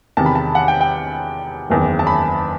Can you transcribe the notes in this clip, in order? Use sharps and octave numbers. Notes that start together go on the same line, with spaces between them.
E2 C3 D#3 A5
B5
A5
F#5
G5
G5
F#1 E2 D#3
A5
B5